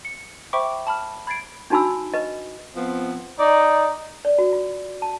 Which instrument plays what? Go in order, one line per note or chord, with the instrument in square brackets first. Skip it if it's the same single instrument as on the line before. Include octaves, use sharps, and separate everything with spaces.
[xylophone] C#7
C5 E5 G5 B5 C#6 D6
A5 B5 F6
B5 G#6 A6 C7 D7
[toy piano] D4 D#4 F#4 G#5 B5 E6
B4 D#5
[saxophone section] F3 B3 C4
[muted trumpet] D#4 [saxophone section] D5
[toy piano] D5
F#4
F4
A5